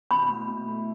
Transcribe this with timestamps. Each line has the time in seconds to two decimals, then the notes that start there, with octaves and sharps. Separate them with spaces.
0.11 B2 B5
0.28 A3 E4
0.47 B2
0.67 A3 E4